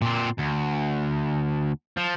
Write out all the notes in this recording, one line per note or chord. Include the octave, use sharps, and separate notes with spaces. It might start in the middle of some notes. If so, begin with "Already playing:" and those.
A#2 C4
D2
F3